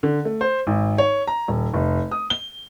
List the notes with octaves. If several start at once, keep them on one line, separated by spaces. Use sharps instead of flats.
D3
A3
C5
G#1
C#5
A#5
D#1
F1
D#6
G7